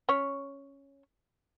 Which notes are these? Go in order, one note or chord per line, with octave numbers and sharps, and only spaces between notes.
C#4 C#5